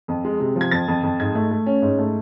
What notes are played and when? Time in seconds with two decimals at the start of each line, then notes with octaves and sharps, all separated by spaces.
0.08 F2
0.24 G#3
0.40 C3
0.56 F3
0.61 G#6
0.71 F2 A6
0.88 F2
1.03 F2
1.20 G#2 G#6
1.35 A3
1.51 A3
1.66 C#4
1.82 G#2
1.98 A3